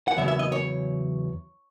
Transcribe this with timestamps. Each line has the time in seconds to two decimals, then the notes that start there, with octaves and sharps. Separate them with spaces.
0.08 F#5
0.17 E2 C#3 F#3 E5
0.28 E5
0.39 D#5
0.52 C#5